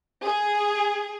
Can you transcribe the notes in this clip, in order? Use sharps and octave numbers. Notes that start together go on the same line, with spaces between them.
G#4